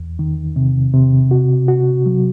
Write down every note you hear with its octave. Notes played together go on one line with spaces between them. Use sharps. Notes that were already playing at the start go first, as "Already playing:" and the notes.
Already playing: E2
D#3
C3
C3
F#4
F#4
F#3